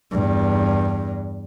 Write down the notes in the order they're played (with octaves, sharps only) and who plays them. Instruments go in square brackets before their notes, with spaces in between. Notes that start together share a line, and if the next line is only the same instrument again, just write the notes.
[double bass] E2 G2